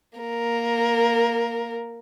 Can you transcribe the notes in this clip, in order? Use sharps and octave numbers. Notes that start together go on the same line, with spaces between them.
A#3 A#4